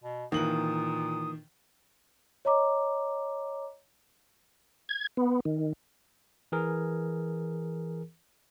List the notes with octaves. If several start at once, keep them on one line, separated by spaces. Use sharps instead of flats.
B2
A#2 D#3 E3 A#3 D#6 F#7
C#5 D#5 A#5 D6
G#6
B3
D#3
E3 G#4 A#4